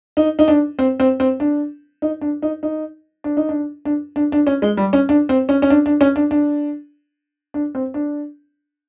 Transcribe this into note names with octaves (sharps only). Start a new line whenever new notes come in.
D#4
D#4
D4
C4
C4
C4
D4
D#4
D4
D#4
D#4
D4
D#4
D4
D4
D4
D4
C#4
G#3
G3
C#4
D4
C4
C#4
C#4
D4
D4
C#4
D4
D4
D4
C4
D4